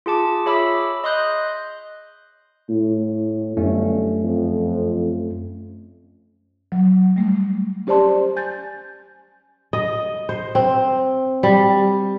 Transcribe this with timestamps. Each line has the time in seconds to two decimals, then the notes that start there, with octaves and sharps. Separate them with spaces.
0.06 F4 G#4 A5 D6
0.46 G#4 C#5 E5 B5 D6 E6
1.04 D#5 C6 D#6 F#6 G6
2.69 A2
3.57 G1 F#2 A3 C#4
4.24 F2
6.72 F#3
7.16 G3 A3
7.87 C#4 G4 C5 D5 A5 C6
8.36 G#5 G6 A6
9.73 D#5
10.29 C5
10.55 C4
11.43 G3